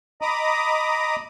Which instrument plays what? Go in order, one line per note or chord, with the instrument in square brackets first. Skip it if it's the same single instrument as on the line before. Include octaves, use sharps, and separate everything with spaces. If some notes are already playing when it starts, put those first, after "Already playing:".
[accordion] D#5 A#5 B5 D6 D#6